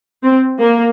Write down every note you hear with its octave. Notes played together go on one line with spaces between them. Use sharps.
C4
A#3